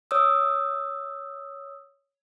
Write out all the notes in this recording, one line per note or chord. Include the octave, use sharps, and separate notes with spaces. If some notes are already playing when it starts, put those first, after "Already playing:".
C#5 D#6 E6